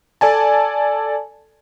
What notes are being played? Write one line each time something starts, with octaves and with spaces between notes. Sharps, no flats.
A4 D5 G#5 A5